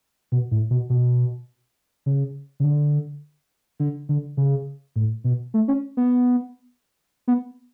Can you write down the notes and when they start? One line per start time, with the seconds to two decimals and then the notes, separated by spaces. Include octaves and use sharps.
0.32 B2
0.51 A2
0.71 B2
0.90 B2
2.06 C#3
2.60 C#3
2.64 D3
3.80 D3
4.09 D3
4.37 C#3
4.96 A2
5.24 B2
5.54 A3
5.68 C#4
5.97 B3
7.28 B3